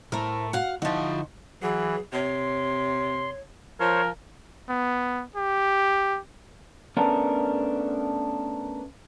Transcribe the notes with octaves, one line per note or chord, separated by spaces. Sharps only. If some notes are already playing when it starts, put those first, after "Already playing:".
A2 A3 E4 A#4 C5
F#4 F5 F#5
D3 F3 D#4 E4 F#4 D#5 F5
E3 F#3 G#4
C3 C#5 C6
F3 A#4 C5 C#5
B3
G4
A3 B3 C#4 D4 A4 A#4